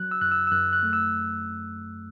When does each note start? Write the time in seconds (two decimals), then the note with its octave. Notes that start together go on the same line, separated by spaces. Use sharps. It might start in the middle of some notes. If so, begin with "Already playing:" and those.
Already playing: F#3 F#6
0.11 E6
0.21 F#2 F#6
0.32 E6
0.47 E6
0.52 F#2 F#6
0.73 F#6
0.83 A3
0.93 E6